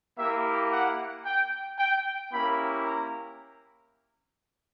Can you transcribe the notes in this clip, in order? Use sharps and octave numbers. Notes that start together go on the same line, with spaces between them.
A#3 E4 G4 E5
F#5
G5
G5
A#3 C#4 E4 G4 B5
A#5